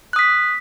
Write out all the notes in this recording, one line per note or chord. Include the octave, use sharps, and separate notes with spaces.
D#6 F#6 B6